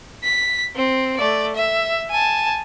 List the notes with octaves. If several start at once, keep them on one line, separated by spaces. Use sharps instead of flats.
B6
C4
A3 D5
E5
G#5 A5